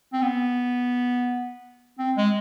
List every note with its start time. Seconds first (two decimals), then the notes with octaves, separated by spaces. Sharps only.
0.13 C4
0.22 B3
1.99 C4
2.17 G#3